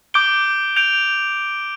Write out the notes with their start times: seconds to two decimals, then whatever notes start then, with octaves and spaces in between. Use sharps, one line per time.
0.14 D6 G6 D7 G7
0.76 G6 D7 F7